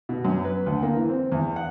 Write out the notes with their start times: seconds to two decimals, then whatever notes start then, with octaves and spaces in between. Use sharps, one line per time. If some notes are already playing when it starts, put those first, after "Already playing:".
0.09 B2
0.25 F#2
0.45 B4
0.66 D2
0.83 A#3
0.96 E3
1.09 C4
1.32 E2
1.56 F#5